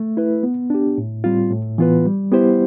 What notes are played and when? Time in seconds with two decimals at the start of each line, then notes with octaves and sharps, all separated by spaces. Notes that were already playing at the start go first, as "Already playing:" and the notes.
Already playing: A3
0.17 E4 B4
0.43 B3
0.70 D4 G4
0.98 A2
1.24 G3 C4 F4
1.51 A2
1.78 E3 B3 F4 B4
2.06 G3
2.32 B3 E4 G4 C5